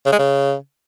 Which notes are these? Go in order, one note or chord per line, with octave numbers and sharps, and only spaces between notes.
C#3
G#3
C#3